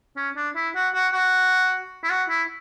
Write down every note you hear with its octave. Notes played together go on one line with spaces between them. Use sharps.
C#4
D4
E4
F#4
F#4
F#4
E4
F#4
E4